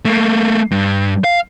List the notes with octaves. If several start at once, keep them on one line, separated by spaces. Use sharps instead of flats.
A3 A#3
G2
F5